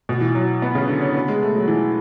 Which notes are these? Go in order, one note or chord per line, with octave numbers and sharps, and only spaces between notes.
B2
E3
F#3
B3
C#3
D3
C#4
B3
G#3
A3
F#3
E3